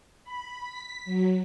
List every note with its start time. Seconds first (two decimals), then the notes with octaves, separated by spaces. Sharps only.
0.23 B5
0.65 B6
1.05 F#3